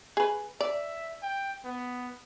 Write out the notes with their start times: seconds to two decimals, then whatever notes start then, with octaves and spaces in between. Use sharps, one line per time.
0.17 G#4 B4
0.60 D5 E5
1.22 G5
1.64 B3